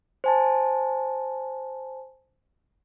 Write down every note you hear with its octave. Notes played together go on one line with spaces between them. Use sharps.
C5 G#5 A5